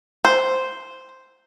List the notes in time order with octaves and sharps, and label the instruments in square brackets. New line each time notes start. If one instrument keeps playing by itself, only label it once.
[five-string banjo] C5